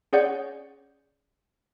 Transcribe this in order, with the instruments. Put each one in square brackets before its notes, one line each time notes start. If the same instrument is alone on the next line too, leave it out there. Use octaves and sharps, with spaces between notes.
[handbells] C#4 G#4 C#5 D5 F#5 G6